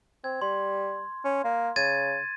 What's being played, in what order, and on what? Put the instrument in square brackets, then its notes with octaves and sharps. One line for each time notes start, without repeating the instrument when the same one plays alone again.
[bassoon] C4 [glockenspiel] G#6
[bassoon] G3 [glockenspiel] C6
[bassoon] C#4
A#3
[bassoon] C#3 [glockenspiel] G#6 A6 D#7